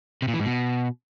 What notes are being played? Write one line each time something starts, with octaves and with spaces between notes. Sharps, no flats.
C3
A#2
E3
G#2
B2